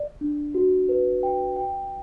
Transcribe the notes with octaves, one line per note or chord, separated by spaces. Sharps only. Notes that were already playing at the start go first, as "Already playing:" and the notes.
Already playing: D5
D4
F#4
B4
G5
G5